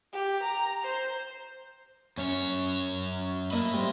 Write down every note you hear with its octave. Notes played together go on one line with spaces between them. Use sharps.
G4
A#5
C5
F#2 C#4 C#5
A3 A#3 D#5 E5 B5
G3 C4